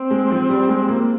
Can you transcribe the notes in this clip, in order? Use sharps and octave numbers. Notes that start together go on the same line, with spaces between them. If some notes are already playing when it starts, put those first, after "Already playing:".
Already playing: C4
G#3
F3
G3
G#3
A#3